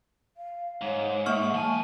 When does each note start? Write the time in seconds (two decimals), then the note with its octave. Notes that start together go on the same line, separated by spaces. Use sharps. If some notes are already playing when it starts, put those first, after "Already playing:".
0.37 F5
0.81 G#2 C#5
1.26 A#3 E5 C#6 F6
1.54 F3 G#5 A5